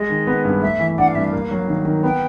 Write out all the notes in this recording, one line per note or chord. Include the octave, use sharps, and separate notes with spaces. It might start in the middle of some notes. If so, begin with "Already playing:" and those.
Already playing: G#3 D#5
D#3
B3
G2
A3 E5
E3
D4 F#5
F5
G2 E5
F5
A#3
F#3
D#3
D#3
B3 G5